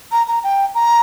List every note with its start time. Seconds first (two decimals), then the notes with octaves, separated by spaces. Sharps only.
0.12 A#5
0.28 A#5
0.44 G5
0.75 A#5